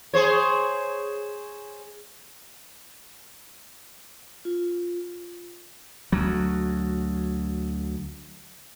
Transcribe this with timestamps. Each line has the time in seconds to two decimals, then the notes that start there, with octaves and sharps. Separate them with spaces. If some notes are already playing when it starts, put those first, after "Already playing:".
0.14 G#4 C5 C#5
4.45 F4
6.12 D2 F#3